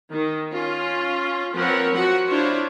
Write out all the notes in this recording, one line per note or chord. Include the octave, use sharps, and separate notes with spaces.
D#3
C#4 F4
F3 C4 A#4 B4 C#5 F#5
F3 F#4 F#5
D4 E4 F4 C5 C#5